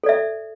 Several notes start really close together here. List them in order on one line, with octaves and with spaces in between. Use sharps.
A4 D5 E5